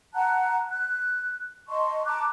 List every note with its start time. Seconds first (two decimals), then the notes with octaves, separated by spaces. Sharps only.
0.14 F#5 A5 A#5 F#6
0.71 F#6
1.68 D#5 A5 C6 C#6
2.05 A5 A#5 D6 F#6